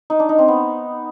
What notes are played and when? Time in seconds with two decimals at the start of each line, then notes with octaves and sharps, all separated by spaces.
0.10 D#4
0.19 D4
0.29 D#4
0.39 C4
0.48 B3